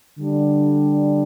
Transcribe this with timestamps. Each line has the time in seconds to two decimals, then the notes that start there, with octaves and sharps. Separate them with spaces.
0.19 D3 G3 D4